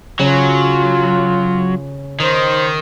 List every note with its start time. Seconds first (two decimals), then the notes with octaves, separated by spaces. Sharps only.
0.19 C#3 F#3 F4
2.20 D#3 C5